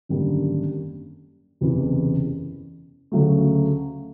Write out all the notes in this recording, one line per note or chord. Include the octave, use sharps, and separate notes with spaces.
G#1 F#2 D3 G3 A#3
F#1 E2 C3 E3
D2 C#3 F#3 A3